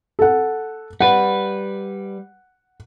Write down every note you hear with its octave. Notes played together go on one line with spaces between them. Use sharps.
A4 F#5
G3 B4 F#5